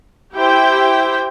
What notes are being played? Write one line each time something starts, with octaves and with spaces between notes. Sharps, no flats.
E4 G4 C5 G5